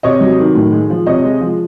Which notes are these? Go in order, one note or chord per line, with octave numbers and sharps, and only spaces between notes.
C3 C#5 D#5
F#3
D#3
A2
G#3
F3
C3 C#5 D#5
G#3
F3